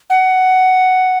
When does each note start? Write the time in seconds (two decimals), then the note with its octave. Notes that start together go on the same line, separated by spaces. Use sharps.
0.10 F#5